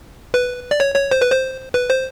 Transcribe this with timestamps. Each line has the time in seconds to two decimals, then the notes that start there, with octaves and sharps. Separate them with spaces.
0.34 B4
0.71 D5
0.80 C#5
0.95 C#5
1.11 C5
1.21 B4
1.32 C5
1.74 B4
1.90 C5